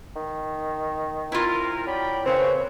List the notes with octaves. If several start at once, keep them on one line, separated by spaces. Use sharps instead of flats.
D#3
C4 E4 F4 A#4
F#3 D5 G5 B5
D#2 C#3 C4 B4 C#5